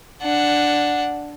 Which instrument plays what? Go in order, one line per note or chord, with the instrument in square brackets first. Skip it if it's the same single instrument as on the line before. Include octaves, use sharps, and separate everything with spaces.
[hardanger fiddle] D4 F#5